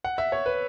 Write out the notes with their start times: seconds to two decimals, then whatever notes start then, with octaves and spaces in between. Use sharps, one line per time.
0.04 F#5
0.18 E5
0.32 C#5
0.46 B4